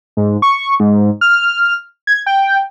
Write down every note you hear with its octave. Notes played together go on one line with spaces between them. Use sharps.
G#2
C#6
G#2
F6
G#6
G5